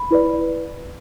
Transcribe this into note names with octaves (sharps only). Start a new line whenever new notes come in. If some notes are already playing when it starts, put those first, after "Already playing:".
Already playing: B5
E4 B4 D5